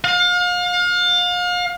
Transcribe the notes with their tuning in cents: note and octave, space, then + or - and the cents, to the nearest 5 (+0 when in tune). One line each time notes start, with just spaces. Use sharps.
F5 +35